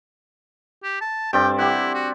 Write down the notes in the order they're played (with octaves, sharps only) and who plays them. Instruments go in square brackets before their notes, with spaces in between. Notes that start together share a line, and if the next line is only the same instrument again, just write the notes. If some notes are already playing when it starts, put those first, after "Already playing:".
[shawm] G4
A5
[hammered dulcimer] G2 C4 D5 [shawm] G5
[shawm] E4 [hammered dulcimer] G4 F#5
[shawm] F#4